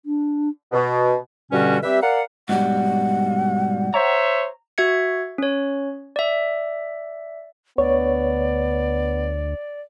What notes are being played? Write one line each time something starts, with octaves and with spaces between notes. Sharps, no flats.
D4
B2
G2 B2 D3 G3 C#4 F#4
G3 C4 G4 B4 E5
A#4 D5 F5 F#5
G#2 B2 G3 F#5
C5 C#5 E5 A#5
F#4 E5 G#6 C#7
C#4 C#5
D5 E5
D2 B3 C#5 D5